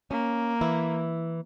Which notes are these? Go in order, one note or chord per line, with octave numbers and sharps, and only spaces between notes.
A#3 C#4
E3 E4